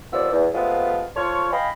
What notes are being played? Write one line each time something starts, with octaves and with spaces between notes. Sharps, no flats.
D#2 C3 F3 B3 D5 E6
E2
C3 F3 G#3 A3 B3 F4
F4 A4 C5 C#5
D#5 F5 G5 G#5 B5